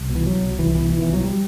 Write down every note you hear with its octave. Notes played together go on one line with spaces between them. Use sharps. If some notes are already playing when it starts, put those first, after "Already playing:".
Already playing: C2
B2
E3
B2 F#3
C2
C2 E3
B2 E3
B2 E3
E3
C2 F#3
G3